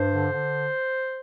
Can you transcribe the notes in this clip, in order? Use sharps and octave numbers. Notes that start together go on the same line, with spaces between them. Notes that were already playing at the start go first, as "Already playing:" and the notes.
Already playing: G2 C5
D3
D3